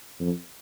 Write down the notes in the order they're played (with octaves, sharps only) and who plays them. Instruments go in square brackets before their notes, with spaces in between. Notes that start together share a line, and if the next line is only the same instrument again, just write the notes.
[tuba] F2